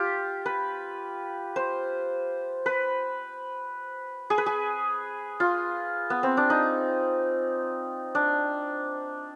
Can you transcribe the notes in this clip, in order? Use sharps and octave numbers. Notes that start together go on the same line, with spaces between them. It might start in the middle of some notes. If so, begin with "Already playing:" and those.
Already playing: F4 G4
B4
C5
B4
G#4
B4
G#4
F4
B3
C4
D4
D#4
D4